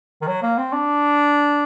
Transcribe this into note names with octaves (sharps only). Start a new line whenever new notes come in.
D#3
F#3
A#3
C4
D4